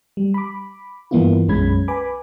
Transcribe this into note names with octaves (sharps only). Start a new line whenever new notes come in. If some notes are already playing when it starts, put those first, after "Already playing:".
G3
B5 D6
G2 E3 A#3 B3 E4 F4
B1 F#2 G#3 C#4 B5 G#6
B4 G#5 B5 D6